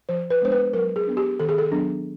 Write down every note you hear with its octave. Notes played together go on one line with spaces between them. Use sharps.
F3 C5
B4
G#3 B3 D4 C5
B4
F#3 A#4
G#4
B3 D4
G4
D#3 A4
G#4
A4
F#3 B3 D4